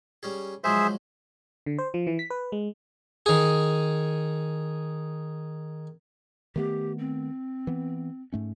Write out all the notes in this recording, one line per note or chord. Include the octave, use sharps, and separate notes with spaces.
G3 C#4 G#4
F3 F#3 G#3 G#4 C5 E5
D3
C5
F3
E3
B6
B4
G#3
D#3 G#4
D#3 A3 B3 G4
C4
E3 B3
G#2 A3 C#4